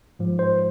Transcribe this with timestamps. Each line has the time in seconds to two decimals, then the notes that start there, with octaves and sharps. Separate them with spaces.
0.19 G#2 F3 G#3
0.39 C5